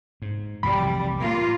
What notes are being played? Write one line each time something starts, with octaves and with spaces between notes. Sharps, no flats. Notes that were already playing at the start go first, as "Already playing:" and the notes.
G#2
F1 C2 E3 G3 B5
A2 A#3 F4